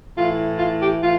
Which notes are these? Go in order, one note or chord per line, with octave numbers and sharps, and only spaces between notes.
A2 E3 F4
F4
G4
A2 E3 F4